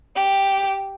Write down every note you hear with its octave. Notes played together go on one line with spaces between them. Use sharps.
G4